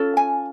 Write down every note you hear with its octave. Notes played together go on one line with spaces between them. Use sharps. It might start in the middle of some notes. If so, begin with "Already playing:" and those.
Already playing: C#4 F4 A4
G#5